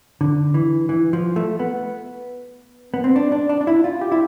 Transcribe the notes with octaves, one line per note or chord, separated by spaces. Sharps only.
D3
E3
E3
F3
A3
B3
B3
C4
D4
D4
D4
D4
E4
F4
G4
E4